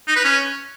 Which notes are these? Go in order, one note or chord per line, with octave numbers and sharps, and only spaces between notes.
D#4
B4
C#4